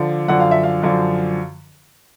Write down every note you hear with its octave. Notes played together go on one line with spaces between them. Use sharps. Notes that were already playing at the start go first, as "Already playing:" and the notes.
Already playing: D3 F3
F#2 D3 F3 F#5
F5
E5
F5
F#2 D3 F3